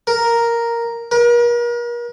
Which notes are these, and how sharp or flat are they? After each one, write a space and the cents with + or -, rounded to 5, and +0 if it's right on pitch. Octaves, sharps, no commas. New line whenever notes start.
A#4 +0
A#4 +40